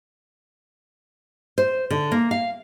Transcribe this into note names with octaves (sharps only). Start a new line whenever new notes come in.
C5
D3
A#3
F5